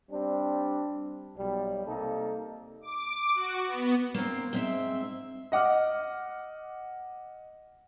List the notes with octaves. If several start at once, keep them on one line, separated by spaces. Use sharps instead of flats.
G3 C4 D4
B1 G3
C3 A#3 D#4 A4
D6
F#4
B3
A#3 C4
G#2 C4 E5
D#5 F#5 D6 F6